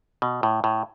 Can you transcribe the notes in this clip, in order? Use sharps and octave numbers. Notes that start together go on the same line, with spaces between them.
B2
A2
A2